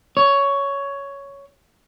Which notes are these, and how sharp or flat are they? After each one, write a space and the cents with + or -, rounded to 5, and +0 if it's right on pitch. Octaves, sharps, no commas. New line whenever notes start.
C#5 +10